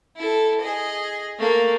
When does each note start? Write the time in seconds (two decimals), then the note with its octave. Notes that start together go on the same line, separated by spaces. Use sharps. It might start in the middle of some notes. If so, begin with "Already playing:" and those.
0.16 E4 A4
0.61 G#4 D#5
1.40 A3 A#3